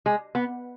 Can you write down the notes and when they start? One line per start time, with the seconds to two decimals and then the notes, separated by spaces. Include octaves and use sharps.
0.06 G#3
0.35 B3